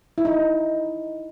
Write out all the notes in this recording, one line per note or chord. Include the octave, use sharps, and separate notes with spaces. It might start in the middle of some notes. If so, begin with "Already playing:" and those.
E4
D#4